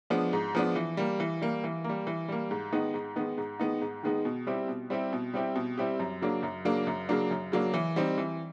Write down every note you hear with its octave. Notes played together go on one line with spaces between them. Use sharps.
F3 G#3 B3 D4
G#2
F3 G#3 B3 D4
E3
G3 A#3
E3
G3 A#3
E3
G3 A#3
E3
G3 A#3
G#2
D#3 G#3 B3 D#4
G#2
D#3 G#3 B3 D#4
G#2
D#3 G#3 B3 D#4
G#2
D#3 G#3 B3 D#4
B2
G3 C4 E4 G4
B2
G3 C4 E4 G4
B2
G3 C4 E4 G4
B2
G3 C4 E4 G4
F#2
C#3 F#3 A#3 D4
F#2
C#3 F#3 A#3 D4
F#2
C#3 F#3 A#3 D4
F#2
C#3 F#3 A#3 D4
E3
G3 C4 D#4
E3